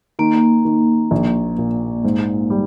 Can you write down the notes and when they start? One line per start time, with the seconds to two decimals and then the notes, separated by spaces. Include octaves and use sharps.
0.19 D#3 A#3
0.65 D#3
1.11 A#1
1.58 A#2
2.05 G#2
2.50 G3